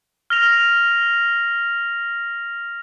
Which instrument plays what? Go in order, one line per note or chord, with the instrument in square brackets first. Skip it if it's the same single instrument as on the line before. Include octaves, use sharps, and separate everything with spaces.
[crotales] F6 A#6 F7